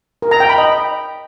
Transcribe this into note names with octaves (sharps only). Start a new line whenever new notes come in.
A#4
A#5
G5
B5
D#5